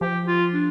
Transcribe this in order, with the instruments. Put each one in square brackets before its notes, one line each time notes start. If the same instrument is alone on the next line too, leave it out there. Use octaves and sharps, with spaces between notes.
[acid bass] F3 [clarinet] G4
[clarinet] F4
D4